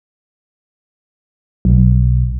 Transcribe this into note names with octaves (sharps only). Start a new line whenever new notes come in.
B1